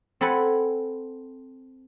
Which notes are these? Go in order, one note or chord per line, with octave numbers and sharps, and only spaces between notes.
C4 A4 F#5 G#5 B5